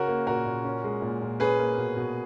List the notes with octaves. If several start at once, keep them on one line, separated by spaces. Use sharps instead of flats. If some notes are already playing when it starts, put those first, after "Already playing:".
Already playing: C#3 C#4 F#4 A#4
A#3
A#2 F#4 A#4
A#2
C#4
G#3
A#2
A#2
C#4 G#4 B4
A#3
B2
B2